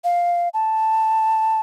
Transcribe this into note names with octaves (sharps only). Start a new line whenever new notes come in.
F5
A5